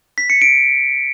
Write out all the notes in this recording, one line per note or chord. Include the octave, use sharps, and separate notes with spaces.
B6
C#7
D7